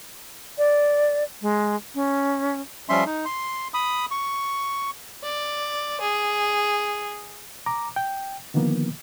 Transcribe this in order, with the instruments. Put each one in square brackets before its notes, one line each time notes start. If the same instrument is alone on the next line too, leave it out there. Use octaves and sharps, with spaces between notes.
[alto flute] D5
G#3
C#4
[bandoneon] F3 G3 C#4 E5 C6
D#4
C6
B5 D#6
C#6
[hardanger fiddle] D5
G#4
[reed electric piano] A#5 D6
G5
D3 D#3 F3 A#3 B3